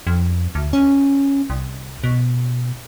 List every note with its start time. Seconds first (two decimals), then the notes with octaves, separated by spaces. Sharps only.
0.07 F2
0.55 D2
0.73 C#4
1.50 C2
2.04 B2